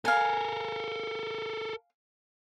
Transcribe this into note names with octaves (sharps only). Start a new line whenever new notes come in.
A4 A#4 F5 G#5